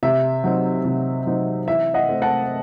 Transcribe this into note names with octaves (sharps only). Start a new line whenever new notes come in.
C3 E5
F#3 C4 D#4
C3
F#3 C4 D#4
E3 E5
D#5 F#5
A3 C4
F#5 A5